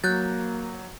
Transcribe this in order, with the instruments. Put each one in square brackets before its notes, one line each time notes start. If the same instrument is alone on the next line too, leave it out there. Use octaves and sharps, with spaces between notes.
[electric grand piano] F#3 [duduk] A#3 [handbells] F#6 G6 A6